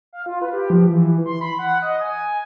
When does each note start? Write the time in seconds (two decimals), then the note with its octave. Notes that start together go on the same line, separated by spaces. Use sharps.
0.13 F5
0.26 F4
0.42 B4
0.53 G4
0.70 F3
0.89 E3
1.26 C6
1.41 B5
1.59 F#5
1.82 D#5
2.01 G#5